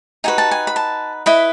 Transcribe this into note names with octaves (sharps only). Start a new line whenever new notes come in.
D#4 F#4 B4 G#5
A5
G#5
B5
A5
E4 B4 D#5 B5